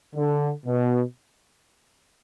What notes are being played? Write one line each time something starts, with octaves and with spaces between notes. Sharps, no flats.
D3
B2